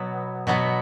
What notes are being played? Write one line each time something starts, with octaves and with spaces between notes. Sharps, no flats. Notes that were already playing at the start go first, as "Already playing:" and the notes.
Already playing: B2 F#3 B3
B2 F#3 B3